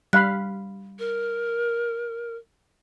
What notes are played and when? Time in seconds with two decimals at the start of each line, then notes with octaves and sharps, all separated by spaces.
0.13 G3 F5 B5 F#6
0.99 A#4